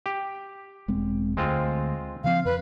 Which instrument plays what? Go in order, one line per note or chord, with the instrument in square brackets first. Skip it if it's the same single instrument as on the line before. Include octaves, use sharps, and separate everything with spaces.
[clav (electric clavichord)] G4
[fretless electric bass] E1 G#3 C4
[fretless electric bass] D2 [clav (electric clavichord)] G#3 C4 F4
[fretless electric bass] C#3 F3 C4 [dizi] F5
[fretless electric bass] F2 [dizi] B4